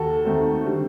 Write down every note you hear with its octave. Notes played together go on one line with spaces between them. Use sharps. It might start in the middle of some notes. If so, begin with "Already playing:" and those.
Already playing: D#2 F#4 A4
D#2 D#3 A3 C4
D3 G3 C4